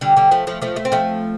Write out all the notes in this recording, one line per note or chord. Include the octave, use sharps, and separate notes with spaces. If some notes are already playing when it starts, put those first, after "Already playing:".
D3 G3
D3 G3
F3 A3
F3 A3
F3 A3
A3
C4
F3 A3